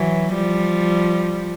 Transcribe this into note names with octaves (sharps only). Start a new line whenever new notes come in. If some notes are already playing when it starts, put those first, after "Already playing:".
Already playing: E3 F#3
F3 G3